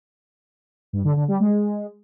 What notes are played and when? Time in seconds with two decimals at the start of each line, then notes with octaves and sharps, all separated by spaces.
0.93 G2
1.05 D3
1.16 D3
1.28 G3
1.40 G#3